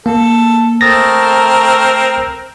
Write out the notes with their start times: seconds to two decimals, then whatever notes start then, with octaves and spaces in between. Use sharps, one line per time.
0.06 A#3 A4
0.81 A3 C4 A#4 D#6 A6 A#6